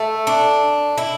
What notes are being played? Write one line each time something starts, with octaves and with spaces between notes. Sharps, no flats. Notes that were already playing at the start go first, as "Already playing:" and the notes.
Already playing: A3
D4
E4